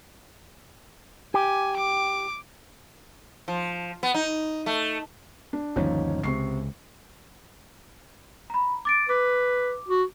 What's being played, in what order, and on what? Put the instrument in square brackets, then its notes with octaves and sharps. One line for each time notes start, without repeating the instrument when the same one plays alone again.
[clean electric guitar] G4 [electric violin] G#5
[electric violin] D6
[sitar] F3
B3
D#4
A3
[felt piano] D4
[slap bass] G1 D#2 [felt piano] F3 C#4 D#4
[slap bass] C#2 [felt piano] C3 C#6 C7
[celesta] A#5 B5
D6 A6 D7
[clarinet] B4 [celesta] D6
[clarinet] F#4